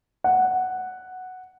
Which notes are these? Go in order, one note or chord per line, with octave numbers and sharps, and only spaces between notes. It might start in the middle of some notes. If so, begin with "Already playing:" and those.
F#5